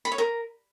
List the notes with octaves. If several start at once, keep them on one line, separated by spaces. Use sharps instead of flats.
B5
C#5
A#4